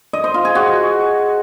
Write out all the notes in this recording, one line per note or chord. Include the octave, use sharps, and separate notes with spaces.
D#5
C5
F4
G#4
F#4